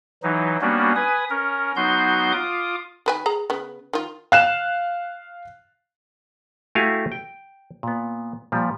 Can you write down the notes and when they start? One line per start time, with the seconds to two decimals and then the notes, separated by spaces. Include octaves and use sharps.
0.23 E3 F#3 D#4
0.61 G3 A#3 B3 C#4 D4 F#4
0.96 B4 G#5 D#6
1.30 C#4 A#4
1.76 F#3 B3 D#4 F#4 C6 G6
2.32 F4 D6 D#6
3.06 D#3 B4 G#5
3.26 G#4 A#5
3.50 C#3 B3
3.93 D#3 F4
4.32 F5 F#6 E7
6.75 A3 E4 F#4 G4 F5 G#5
7.12 G5
7.83 A#2 B3
8.52 A#2 F3 G3